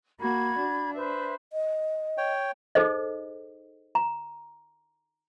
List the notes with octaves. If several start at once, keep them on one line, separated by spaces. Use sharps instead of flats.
A#3 F#4 B5 G#6
D4
B4 C5 E5
D#5
C#5 G5
D#4 G#4 A4 C5 D#5
A#5